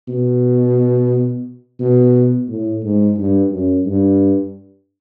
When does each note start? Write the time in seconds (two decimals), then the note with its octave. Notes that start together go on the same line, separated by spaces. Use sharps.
0.09 B2
1.80 B2
2.49 A2
2.83 G#2
3.17 G2
3.51 F#2
3.86 G2